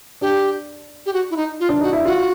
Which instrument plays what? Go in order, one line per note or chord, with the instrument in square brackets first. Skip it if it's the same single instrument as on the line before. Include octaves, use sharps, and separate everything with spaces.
[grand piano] D4 [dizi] G4
[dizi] G4
F#4
E4
D#4
F4
[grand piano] D4
[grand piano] D#4 [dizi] F#4
[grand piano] E4
[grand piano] F4 [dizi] F#4